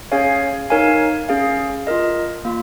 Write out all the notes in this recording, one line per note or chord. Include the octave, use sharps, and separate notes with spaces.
C#4 G#4 C#5 F5 G#5
D#4 A#4 C#5 F5 G#5
C#4 G#4 F5
F4 A#4 D#5
A#3 F4